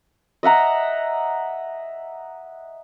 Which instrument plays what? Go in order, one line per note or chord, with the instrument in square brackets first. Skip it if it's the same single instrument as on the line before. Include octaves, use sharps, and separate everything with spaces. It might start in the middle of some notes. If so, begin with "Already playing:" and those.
[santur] D#5 E5 F#5 A#5